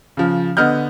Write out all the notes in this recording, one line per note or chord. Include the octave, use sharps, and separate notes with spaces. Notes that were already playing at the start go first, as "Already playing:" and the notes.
C#3 F3
D3 B3 D#5 F6 G6